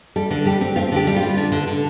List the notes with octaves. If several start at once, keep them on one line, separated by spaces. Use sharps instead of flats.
G3 A4
D3
G3 G4
C4
C4 F4
D3 G4
G3
F4
G3
D3
D3
D3